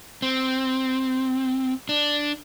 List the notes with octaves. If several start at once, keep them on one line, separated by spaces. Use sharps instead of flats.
C4
D4